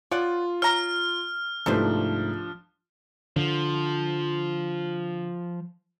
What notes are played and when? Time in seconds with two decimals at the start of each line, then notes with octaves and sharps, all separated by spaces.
0.11 F4 C#5 D5 F#5
0.62 C#5 A#5 F6
1.66 C2 G#2 F3 A3 D4 A4 B4 C5
3.36 D3 F3